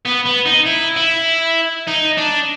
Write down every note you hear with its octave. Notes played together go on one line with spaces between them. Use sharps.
B3
B3
D#4
E4
E4
D#4
D4